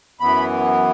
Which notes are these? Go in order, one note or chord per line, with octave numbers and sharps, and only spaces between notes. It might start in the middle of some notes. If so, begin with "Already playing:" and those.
F#2 E3 B3 B5